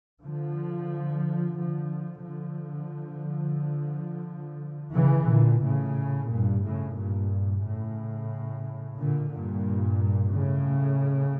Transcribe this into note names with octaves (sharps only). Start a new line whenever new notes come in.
D3 F3
D3 F3
D3 F3
C#3 E3
A#2 D3
A2 C#3
G2 A#2
A2 C#3
G2 A#2
A2 C#3
A#2 D3
G2 A#2
A2 C#3